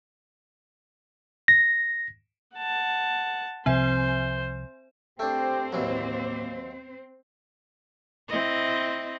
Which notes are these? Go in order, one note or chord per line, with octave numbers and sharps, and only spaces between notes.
A#6
F#5 A5
C2 C3 F3 C4 C5 E5 G#5
A3 C4 D4 G4 C5 G5
D#2 A2 E3 F#3 A#3
C4 E4 D#5